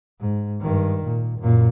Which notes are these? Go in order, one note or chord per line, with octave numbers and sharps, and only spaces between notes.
G#2
G2 D#3
A#2
F#2 A#2